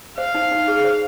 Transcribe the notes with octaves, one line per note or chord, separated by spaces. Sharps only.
C5 F5
D#4
D#4
G#4
C5